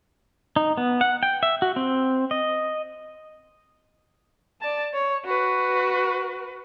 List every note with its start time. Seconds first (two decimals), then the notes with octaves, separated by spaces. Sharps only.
0.56 D#4
0.77 B3
1.01 F#5
1.23 G5
1.43 E5
1.62 F#4
1.76 C4
2.31 D#5
4.61 D5 A5
4.94 C#5
5.25 F#4 B4